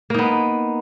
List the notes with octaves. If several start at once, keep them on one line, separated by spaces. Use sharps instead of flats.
A#3 B3 D#4